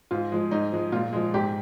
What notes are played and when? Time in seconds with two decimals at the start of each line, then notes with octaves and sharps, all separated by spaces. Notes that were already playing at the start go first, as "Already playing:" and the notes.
0.11 G#2 F4
0.32 F3 G#3
0.51 G#2 D#4
0.72 F3 G#3
0.92 A#2 F4
1.13 F3 G#3
1.34 G#2 G4